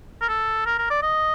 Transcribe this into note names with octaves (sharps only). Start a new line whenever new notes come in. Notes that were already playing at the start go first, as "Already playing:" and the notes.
A#4
A4
A#4
A#4
D5
D#5